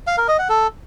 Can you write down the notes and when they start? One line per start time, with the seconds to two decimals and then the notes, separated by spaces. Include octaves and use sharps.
0.07 F5
0.18 A#4
0.28 D#5
0.39 F#5
0.49 A4